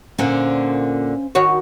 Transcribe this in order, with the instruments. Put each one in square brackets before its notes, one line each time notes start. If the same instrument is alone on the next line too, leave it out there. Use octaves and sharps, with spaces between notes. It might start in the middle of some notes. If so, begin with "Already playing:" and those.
[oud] A#2 D3 [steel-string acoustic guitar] C#4 C5 F5
[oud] D#3 F#4 C#5